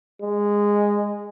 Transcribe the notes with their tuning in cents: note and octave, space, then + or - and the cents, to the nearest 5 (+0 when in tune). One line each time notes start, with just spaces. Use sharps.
G#3 -15